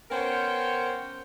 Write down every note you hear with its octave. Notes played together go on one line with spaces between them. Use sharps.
B3 C#4 A#4 C5 C#5 G5